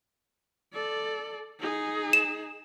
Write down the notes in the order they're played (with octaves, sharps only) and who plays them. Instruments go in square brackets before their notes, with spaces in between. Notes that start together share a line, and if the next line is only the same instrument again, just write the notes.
[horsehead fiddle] A4 D5
D#4 G#4
[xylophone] E7